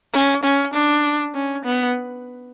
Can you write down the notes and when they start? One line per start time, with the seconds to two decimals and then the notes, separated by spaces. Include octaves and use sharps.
0.13 C#4
0.44 C#4
0.74 D4
1.35 C#4
1.65 B3